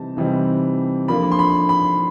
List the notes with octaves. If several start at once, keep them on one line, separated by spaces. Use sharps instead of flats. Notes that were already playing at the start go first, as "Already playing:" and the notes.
Already playing: C3 E3 G3 C4 D#4 A5
C3 E3 G3 C4 D#4
D3 F3 A#3 D4 F4 B5
C6
B5
B5